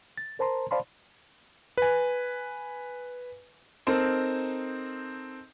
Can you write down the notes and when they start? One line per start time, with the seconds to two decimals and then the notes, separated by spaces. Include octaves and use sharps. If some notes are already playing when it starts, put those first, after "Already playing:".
0.18 A6
0.39 A#4 C5 A5 A#5 C6
0.71 C5 D5 F5 A5 B5 C6
1.77 B4 G#5
3.87 C4 D#4 A4 A#4 C5